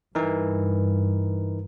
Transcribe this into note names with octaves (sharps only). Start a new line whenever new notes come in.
G2 E3 D#4 A#4